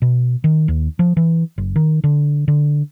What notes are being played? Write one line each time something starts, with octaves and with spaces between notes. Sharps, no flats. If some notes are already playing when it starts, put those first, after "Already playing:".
B2
D#3
D#2
F3
E3
F#1
D#3
D3
D3